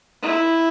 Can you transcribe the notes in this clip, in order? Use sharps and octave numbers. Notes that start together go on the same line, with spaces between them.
E4